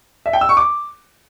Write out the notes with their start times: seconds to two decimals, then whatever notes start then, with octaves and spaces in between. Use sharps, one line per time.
0.26 E5
0.33 G5
0.41 E6
0.49 C#6
0.57 D6